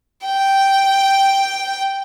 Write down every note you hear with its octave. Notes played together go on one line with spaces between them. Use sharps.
G5